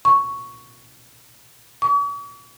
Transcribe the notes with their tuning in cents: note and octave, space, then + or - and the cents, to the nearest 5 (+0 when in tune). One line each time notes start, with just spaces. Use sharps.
C#6 +5
C#6 +45